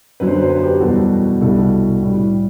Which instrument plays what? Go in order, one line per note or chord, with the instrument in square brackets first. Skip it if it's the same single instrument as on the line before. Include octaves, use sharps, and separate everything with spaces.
[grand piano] F#2 D3 F#3 B4
C5
B4
C5
B4
C5
G4 B4
G4
E2 B2 G3 F#4 A4
C2 B2 G3 F#4 A4
A2 G3